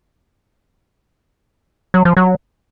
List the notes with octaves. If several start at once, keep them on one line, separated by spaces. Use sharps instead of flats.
F#3
F3
F#3